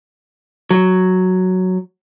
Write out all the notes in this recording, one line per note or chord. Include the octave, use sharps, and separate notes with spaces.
F#3